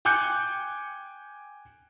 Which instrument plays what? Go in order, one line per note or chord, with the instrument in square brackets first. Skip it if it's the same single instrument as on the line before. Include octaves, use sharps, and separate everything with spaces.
[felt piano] G5 G#5 D6 F#6 G6 C#7